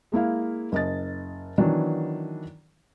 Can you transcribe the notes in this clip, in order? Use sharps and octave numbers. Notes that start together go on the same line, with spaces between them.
G#3 A#3 E4 F5
F#1 D#5 A6
D#3 E3 F#3 B3 D4